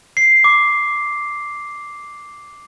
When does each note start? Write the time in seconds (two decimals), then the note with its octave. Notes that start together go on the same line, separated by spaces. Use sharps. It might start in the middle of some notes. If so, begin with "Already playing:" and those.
0.17 C7
0.44 D6